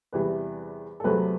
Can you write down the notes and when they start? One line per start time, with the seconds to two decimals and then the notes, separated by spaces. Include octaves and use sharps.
0.13 E2 C3 E3 G3 B4
1.00 A4
1.04 E2 C3 F#3 A3 C4 B4